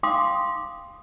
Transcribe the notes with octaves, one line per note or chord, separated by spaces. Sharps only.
F5 G5 C6 D6 D#6